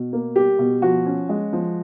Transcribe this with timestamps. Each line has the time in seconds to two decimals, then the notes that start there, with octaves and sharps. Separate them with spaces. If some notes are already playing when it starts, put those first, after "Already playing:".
Already playing: B2
0.13 A#3
0.36 G3 G4
0.59 B2
0.82 F3 F#4
1.06 C#4
1.29 G#3
1.53 F3